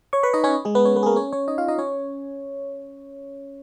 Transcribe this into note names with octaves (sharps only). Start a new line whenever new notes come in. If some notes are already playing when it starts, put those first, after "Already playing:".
C#5 C#6
B4 B5
D#4 D#5
C#4 C#5
G#3 G#4
B3 B4
C#4 C#5
B3 B4
G#4
A#3 A#4
C#4 C#5
C#4 C#5
D#4 D#5
F4 F5
D#4 D#5
C#4 C#5